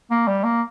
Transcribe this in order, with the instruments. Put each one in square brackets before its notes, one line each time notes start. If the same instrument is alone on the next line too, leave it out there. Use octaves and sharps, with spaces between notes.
[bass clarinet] A#3
G3
A#3